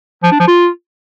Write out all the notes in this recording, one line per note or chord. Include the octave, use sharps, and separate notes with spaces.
F3
D4
F3
F4